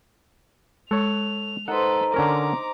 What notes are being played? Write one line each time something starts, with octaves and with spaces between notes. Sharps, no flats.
G#3 A4 C#5 F7
D#4 A4 B4 C5 F#5
D3 C#4 A#4 A#5 D6